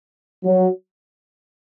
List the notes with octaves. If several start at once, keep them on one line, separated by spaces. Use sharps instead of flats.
F#3